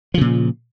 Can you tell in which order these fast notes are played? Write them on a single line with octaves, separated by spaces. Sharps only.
F3 C#3 A#2